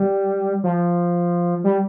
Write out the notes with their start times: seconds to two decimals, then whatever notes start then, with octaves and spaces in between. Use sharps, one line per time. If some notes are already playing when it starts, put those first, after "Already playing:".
Already playing: G3
0.63 F3
1.64 G3